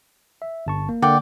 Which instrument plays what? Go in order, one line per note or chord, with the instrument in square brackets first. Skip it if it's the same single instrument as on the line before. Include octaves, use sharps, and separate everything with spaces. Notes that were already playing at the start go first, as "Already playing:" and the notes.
[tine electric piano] E5
G1 A5 C#6
A#3
[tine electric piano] D3 A#3 F#5 [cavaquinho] D5 G5